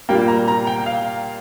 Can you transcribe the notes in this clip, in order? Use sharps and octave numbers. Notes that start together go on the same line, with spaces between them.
A#2 G3 A#3 G5
A#5
A#5
G5
F5